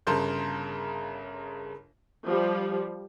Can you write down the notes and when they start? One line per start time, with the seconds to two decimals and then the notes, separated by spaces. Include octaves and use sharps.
0.07 G1 C#3 A#4 A5 C6 G6
2.27 F3 G3